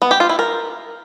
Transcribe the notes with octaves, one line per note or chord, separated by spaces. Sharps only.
B3
G4
F4
E4
A#4